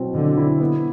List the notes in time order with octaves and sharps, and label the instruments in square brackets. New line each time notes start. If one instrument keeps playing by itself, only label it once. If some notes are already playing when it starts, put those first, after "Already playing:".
Already playing: [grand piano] B2 F#3 C4 E4
[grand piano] B2 [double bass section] D3
[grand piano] E4
B3